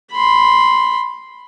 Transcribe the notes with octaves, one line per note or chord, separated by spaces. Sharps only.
B5 C6